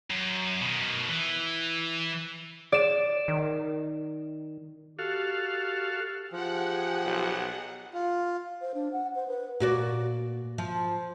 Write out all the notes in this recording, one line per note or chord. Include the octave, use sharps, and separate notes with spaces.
F#2
B2 D#3
E3
D5 E7
D#3
F#4 G4 A4 F5
F3 G4 G#4 F#5
B1
F4
C5
D4
F#5
C5
B4
A#2 F#4 D5
F3